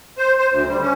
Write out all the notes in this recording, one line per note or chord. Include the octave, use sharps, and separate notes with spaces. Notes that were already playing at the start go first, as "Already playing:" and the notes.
C5
C5
D2
G3
C#4